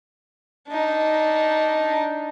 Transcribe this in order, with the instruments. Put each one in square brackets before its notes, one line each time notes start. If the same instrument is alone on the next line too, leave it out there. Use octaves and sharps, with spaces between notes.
[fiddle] D4 D#4